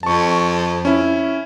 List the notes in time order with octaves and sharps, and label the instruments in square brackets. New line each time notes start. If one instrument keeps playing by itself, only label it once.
[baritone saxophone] F2 [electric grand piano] A5 C#6
[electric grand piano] C#4 E4